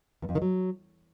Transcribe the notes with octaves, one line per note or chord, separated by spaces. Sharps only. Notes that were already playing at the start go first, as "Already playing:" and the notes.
E2
F2
D#3
F#3